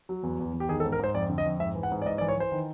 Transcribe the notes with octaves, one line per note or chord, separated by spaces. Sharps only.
F#3
E2
E2
E2
G4
D#3 G#4
A4
G#2
A#4
G#2 C5
F2 D5
D3
D#5
F2
G#2 E5
E3
F#5
G#2
D5
G#2 D#5
D5
E3
C#5
E3 C5
D#3